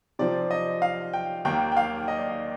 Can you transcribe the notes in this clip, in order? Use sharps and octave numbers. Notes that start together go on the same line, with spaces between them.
C3 F3 C4 D5
D#5
F5
G5
D#2 D#3 A#3 G5
G5
F5
D#5
D5
D#5